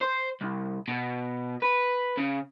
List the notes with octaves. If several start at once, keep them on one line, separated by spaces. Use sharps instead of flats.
C5
C2
B2
B4
C#3